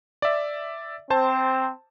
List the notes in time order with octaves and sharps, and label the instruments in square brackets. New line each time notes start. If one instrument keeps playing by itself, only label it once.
[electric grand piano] D5 E5
[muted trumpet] C4 [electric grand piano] C5 A5